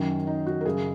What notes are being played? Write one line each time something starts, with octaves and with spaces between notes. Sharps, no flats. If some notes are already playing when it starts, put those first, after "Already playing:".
Already playing: F#2 D#3 F#3 C#4
D#4
F#4
A#4
F#2 C#3 F#3 G#4